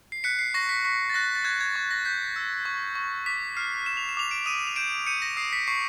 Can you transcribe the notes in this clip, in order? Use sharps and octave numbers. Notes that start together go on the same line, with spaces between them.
C7
F#6 B6 C#7
C7
C#6 A#6
B6
C#6 B6
A6
F#6 A#6
A6
F#6 G#6
G#6
C#6
A#6
G6 B6
E6
C#6
C#6
D6 B6
F6 C7
F6 E7
F7
E7
D6 F7
D7 E7
D#6 D#7 F7
F7
G6 D7 E7
G6 C#7 D#7
A#6
D#6 C7
B6
C#6 C7